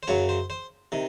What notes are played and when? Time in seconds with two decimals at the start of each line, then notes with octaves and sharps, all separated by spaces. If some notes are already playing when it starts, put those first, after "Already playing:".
0.03 C5
0.08 F#2 C#3 F#3 C#5
0.29 C5
0.50 C5
0.92 C3 D#3